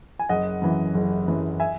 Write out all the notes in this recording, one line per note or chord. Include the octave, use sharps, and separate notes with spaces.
G#5
F#1 D#5 F#5
F#2 E3
F#1
F#2 E3
E5 G#5